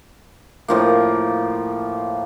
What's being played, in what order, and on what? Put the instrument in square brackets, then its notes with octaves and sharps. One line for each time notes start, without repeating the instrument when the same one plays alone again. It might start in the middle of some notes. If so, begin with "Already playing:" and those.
[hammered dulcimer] A2 F3 A#3